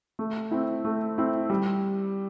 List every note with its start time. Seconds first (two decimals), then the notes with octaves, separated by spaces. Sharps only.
0.19 A3
0.51 C4 E4
0.85 A3
1.18 C4 E4
1.50 G3